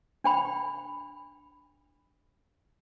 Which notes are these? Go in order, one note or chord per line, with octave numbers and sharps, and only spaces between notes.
D4 G5 B5